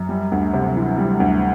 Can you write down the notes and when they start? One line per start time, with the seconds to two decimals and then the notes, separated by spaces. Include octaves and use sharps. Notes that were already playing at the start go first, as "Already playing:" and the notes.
Already playing: F#2
0.09 G3
0.32 D2
0.53 C3
0.76 E3
0.98 G3
1.20 D2